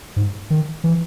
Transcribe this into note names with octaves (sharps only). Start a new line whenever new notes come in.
G#2
D#3
E3